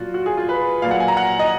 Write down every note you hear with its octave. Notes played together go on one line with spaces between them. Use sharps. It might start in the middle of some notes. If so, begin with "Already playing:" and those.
Already playing: A#2 F#3 F4 F#4
F#4
G#4
F4
B4
A#2 F#3 F5
F#5
G#5
A#5
F#5
D#5